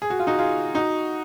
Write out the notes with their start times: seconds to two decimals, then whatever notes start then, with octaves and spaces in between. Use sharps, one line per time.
0.02 G#4
0.10 F#4
0.19 F4
0.27 D#4 F#4
0.39 F4 G#4
0.74 D#4 F#4